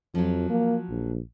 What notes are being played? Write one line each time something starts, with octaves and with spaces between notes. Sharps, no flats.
F2 F3 F#3
A#3
A#1